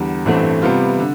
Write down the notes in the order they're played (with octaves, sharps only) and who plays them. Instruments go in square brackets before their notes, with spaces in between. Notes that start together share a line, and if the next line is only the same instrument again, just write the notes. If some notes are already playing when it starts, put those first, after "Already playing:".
Already playing: [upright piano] E2 D3 G3
A1 G2 E3 A3 C4
C3 G3 B3 F4
D3